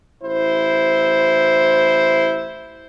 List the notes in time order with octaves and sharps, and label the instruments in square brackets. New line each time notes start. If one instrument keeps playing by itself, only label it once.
[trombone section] A1 E4 C5